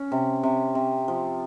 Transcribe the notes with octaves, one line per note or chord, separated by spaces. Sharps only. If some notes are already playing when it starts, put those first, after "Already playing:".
Already playing: C#4
C3
C3
C3
F3